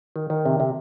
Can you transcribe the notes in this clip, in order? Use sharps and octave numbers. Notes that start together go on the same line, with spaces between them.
D#3
D#3
C3
C3